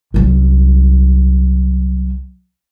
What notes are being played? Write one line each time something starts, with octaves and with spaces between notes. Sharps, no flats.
C2 F#3